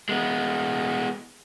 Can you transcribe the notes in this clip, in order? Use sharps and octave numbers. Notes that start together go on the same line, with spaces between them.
G#3 B3